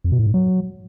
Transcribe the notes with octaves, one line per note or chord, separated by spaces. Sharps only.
F2
B2
A2
G#2
F#3